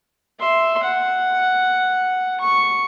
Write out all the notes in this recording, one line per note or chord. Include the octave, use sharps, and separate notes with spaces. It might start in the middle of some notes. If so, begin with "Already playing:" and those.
E5 C6
F#5
C#6